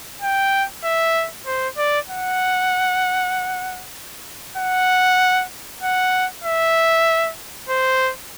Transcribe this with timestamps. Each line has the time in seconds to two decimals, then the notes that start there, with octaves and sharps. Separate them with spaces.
0.22 G5
0.84 E5
1.46 C5
1.78 D5
2.09 F#5
4.57 F#5
5.83 F#5
6.44 E5
7.69 C5